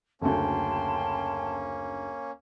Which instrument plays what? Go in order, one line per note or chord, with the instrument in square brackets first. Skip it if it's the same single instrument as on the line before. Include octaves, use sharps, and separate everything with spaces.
[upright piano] F#1 D2 [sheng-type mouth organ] A#3 C#4 [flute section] G5 A5 C6